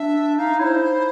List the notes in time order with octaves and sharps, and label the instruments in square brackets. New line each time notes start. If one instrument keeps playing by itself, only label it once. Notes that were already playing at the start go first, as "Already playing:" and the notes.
Already playing: [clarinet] D4 [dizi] E5
[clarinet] D#4 [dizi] F5
[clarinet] E4 [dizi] C5 C#5